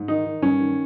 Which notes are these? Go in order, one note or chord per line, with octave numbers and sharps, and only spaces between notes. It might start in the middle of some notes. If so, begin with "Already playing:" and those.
Already playing: G#2
D#3 D#4
D#3
G2 C#4
D#3